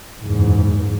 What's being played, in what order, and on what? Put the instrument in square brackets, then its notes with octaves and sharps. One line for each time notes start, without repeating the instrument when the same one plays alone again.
[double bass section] F#1 E2 G#2